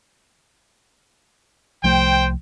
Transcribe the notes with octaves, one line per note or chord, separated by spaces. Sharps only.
C2 F3 A3 C5 G5